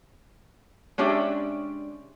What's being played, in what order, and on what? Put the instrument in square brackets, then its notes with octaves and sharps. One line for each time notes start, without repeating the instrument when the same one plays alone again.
[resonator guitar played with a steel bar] G#3 C#4 D4 G4 D5 E5